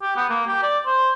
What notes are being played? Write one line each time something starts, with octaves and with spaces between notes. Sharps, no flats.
G4
B3
A#3
G4
D5
C5